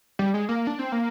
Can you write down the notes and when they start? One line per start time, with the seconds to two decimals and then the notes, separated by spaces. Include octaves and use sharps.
0.19 G3
0.34 G#3
0.49 A#3
0.67 D4
0.79 C4
0.92 A#3